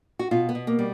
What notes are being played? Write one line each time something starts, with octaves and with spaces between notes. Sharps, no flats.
F#4
B2 F4
B3
B2
A#3
G3